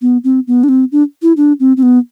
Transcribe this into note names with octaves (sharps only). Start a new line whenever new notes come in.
B3
C4
B3
D4
C4
D4
E4
D4
C4
C4
B3